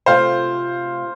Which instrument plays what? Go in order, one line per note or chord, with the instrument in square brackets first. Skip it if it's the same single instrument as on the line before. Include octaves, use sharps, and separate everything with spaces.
[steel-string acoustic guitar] C3 A3 F4 [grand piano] C5 F5